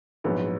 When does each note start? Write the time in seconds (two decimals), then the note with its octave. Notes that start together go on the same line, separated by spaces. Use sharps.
0.24 A#1 G#2 F#3 B3